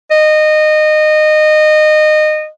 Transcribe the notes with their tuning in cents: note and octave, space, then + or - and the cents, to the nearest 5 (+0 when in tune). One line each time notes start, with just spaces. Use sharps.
D#5 -20